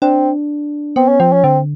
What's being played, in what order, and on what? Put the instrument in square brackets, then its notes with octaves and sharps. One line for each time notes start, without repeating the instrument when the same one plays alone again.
[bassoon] C4 [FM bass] D4
[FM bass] B3 [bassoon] C4
[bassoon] C#4
[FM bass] F3 [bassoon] C4
[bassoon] C#4
[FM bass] D3 [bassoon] C4